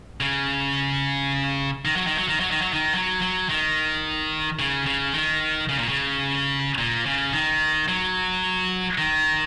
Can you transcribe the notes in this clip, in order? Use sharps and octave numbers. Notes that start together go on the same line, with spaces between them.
C#3
D#3
F#3
D#3
F#3
D#3
F#3
D#3
F#3
D#3
F#3
F#3
D#3
C#3
C#3
D#3
C#3
A#2
C#3
A#2
C#3
D#3
F#3
D#3